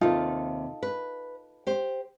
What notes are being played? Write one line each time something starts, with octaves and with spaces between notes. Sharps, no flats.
D#2 C3 D#4 F4 A4
B4
G4 C5